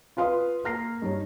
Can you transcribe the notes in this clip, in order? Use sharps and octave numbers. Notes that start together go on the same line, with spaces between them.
F4 B4 F5 C6 D#6
A#3 F6 A#6 C7
G2 D#4 C#5